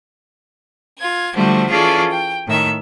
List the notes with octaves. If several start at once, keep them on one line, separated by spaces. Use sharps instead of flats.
F4 G#6
D3 F3 G3 A3 F#4 C5
E3 C#4 F4 G#4 A4 D5
G5
A2 D#3 E5